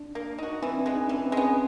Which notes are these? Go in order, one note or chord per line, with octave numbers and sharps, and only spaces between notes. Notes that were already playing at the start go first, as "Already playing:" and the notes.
Already playing: D4
A#3
D#4 F#4
E3 C4
D4
G#3 B3
D#4
E3 C#4
C4
G#3 B3 C#4